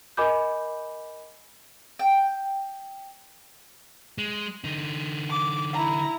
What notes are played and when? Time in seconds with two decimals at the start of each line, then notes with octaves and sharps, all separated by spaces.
0.17 A#4 D#5 G#5 B5 D6 G6
1.99 G5
4.18 G#3
4.64 D3 D#4
5.30 D6
5.73 E4 A#5